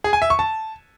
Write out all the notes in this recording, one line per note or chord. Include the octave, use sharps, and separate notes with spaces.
G#4
G#5
E5
C#6
A5